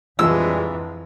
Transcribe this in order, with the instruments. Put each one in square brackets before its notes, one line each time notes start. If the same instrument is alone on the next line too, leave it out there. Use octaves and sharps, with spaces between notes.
[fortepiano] A#1 F3 [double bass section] F2 E3 [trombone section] G3 G#3 D4 [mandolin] E6